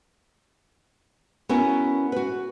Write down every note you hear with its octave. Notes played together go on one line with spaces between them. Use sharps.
B3 C#4 E4 F#4 A#4
F#4 B4